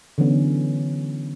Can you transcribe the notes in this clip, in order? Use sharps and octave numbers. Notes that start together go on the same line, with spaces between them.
D3 E3 F#3 B3 C#4